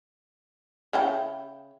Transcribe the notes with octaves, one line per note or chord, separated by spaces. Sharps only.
C#3 E4 G5